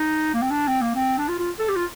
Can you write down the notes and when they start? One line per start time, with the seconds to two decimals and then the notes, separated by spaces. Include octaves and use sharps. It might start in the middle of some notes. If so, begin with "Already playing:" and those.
Already playing: D#4
0.34 A#3
0.42 C4
0.50 D4
0.67 C4
0.81 A#3
0.95 C4
1.18 D4
1.28 F4
1.40 F4
1.59 A4
1.68 G4
1.76 F4